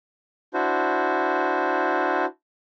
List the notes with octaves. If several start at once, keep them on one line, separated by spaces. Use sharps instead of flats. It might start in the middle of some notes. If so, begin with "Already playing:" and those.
D4 E4 F#4 C5